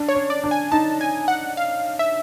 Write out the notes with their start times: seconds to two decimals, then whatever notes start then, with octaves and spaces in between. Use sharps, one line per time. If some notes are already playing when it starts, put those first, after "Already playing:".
Already playing: D4
0.09 C#5
0.15 C#4
0.30 D5
0.44 D4
0.51 G#5
0.72 D#4 A5
1.01 G#5
1.28 F#5
1.57 F5
1.99 E5